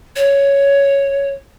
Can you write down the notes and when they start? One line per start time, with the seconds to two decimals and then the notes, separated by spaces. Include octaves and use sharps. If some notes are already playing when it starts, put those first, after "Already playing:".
0.16 C#5